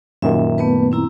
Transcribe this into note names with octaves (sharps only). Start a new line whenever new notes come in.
F#2 A#2 D#3 E5
A3 B3 B4
C4 E4 A#5